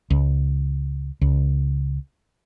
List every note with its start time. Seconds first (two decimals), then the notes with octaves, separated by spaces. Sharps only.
0.10 C#2
1.21 C#2